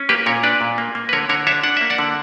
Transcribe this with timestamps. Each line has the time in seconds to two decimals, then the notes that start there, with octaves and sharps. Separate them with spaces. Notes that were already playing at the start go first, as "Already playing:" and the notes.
Already playing: C#4
0.09 A#3 G4 B4
0.26 A#2 A#4 C#5
0.43 D4 B4 D5
0.61 A#2
0.78 A#3
0.95 A#3
1.09 B4
1.13 D3 A#4 C#5
1.29 D3 A#4 C#5
1.47 D4 C#5 E5
1.63 D4 F#5
1.77 A#3 E5
1.90 D5 F#5
1.98 D3